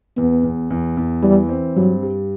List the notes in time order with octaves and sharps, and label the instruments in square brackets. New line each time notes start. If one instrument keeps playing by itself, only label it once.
[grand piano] E2 [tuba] B3
[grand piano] E2
E2
E2
[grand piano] E3 [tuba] G3
[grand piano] C4
[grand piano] G2 [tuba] F#3
[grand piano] G3